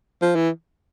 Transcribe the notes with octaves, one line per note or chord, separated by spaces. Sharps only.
F3
E3